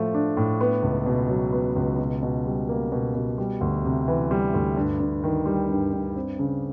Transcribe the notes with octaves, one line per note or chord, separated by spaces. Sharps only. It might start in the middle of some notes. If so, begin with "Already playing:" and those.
Already playing: A2 F3 A3
D4
A2
B3
C#2
B2
F#3
B3
C#2
B2
B2
G3
A#3
B2
B2
G3
D2
C3
E3
G3
D2
G2
G2
D#3
G3
G2
G2
C4
C#3